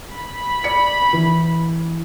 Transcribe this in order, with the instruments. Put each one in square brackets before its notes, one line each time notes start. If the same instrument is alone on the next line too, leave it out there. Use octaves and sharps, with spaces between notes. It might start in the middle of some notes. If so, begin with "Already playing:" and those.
[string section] B5
[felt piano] D5 C#7
E3